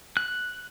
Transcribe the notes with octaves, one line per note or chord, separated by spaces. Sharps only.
F#6